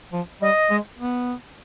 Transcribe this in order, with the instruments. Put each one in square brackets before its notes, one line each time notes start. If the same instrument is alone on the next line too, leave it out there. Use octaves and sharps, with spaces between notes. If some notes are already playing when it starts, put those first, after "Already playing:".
[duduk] F3
[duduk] G3 [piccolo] D#5
[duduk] G#3
B3